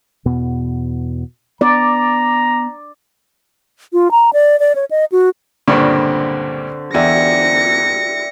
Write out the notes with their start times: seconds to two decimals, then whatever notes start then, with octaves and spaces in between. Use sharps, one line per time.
0.25 E2 B2 B3
1.61 B3 D5 A#5
3.93 F4
4.11 A#5
4.33 D5
4.60 D5
4.75 C#5
4.91 D#5
5.12 F#4
5.68 C#2 G2 A#2 D3 C4 C#6
6.94 E2 G4 D5 E5 A#6 C#7